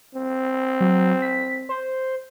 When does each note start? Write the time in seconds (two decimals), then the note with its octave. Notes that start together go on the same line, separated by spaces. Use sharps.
0.15 C4
0.81 F#3
1.22 B6
1.69 C5